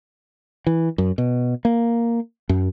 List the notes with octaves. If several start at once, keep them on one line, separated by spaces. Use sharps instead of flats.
E3
F#2
B2
A#3
F#2